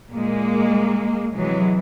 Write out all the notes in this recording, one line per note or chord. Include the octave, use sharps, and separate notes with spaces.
A#2 G#3 A#3
C3 E3 F#3 G#3